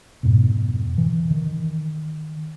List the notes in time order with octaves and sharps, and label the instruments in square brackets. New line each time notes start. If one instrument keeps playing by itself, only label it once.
[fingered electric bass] F2 G#2 B2
E3
D#3